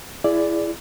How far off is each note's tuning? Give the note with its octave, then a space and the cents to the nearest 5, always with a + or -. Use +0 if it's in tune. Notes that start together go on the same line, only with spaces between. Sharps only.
E4 +20 G#4 +0 D5 +0